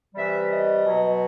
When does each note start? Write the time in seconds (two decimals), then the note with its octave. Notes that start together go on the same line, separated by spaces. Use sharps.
0.15 C3 E3 G3 E5
0.49 D#5
0.85 B2 F#3